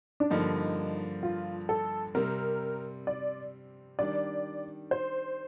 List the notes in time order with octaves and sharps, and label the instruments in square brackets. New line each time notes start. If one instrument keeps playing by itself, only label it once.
[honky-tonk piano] D4
[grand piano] G2 D3 F3 A#3 [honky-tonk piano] D#4
[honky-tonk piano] F4
A4
[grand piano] C3 G3 C4 [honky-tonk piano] A#4
[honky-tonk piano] D5
[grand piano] D#3 G3 D4 [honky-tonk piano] D5
[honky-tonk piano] C5